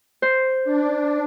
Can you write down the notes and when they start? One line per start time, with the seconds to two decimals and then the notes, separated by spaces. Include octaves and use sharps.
0.22 C5
0.64 D4